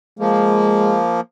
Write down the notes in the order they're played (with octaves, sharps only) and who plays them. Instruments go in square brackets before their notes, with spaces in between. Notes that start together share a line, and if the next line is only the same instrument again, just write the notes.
[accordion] F3 A#3 [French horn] G#3